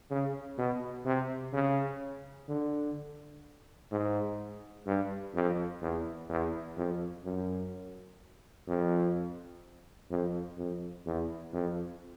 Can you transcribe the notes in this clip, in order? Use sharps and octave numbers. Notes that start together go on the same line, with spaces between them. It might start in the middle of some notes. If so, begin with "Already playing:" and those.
C#3
B2
C3
C#3
D3
G#2
G2
F2
E2
E2
F2
F#2
F2
F2
F2
E2
F2